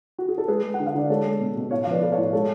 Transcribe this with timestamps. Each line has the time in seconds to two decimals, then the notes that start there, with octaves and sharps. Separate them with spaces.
0.18 F#4
0.29 G#4
0.38 A4
0.48 G#3 G#4 B4
0.63 G#3
0.74 F#5
0.80 D3
0.86 F5
0.95 D3 D5
1.09 G#3 A4 C#5
1.25 G#3
1.40 B2
1.57 B2
1.71 A2 C#5 F5
1.84 F5
1.87 F3 B4 D5
2.02 A3
2.12 C#5 F5
2.18 A2
2.33 G#3 A4 C#5